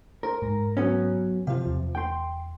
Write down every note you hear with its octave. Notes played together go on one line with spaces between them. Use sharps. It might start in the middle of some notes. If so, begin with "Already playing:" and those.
A#4 C5
G#2 A#6
F#3 B3 C#4
C3 F3 F4 F5
E2
G5 C6